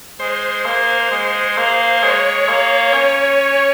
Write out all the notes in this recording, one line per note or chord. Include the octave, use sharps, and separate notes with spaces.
G#3 C5
A#3
G#3
A#3
G#3 C#5
A#3
C#4